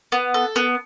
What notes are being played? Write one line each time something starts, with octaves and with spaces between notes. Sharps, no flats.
B3
A4
B3